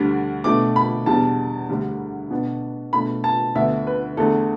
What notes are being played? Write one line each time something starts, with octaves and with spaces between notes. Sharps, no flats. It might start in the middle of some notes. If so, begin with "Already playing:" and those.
Already playing: D2 D3 G3 D4
B2 A3 D4 D6
B5
E2 B2 G3 D4 A5
D2 D3 G3
B2 B3 D4
B2 A3 D4 B5
A5
D2 D3 B3 D4 E5
B4
E2 D3 A3 A4